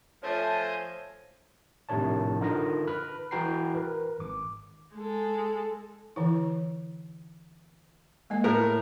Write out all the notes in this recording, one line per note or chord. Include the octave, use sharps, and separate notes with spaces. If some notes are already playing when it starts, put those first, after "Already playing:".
F3 A3 C5 C#5 D#5 G#5
A#1 A2 C3 D#3 C#5 A5
D3 D#4 F4 A#4 B4 A#6
B4 B5 F6
E3 E4 F#4 G5 A#5 C7
A#4 B4
G#1 D6
G#3 A4
D3 E3 E4
G#3 A#3 D#5
A2 A#4 F6